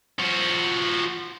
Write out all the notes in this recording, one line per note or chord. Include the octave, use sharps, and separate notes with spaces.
F3 F#4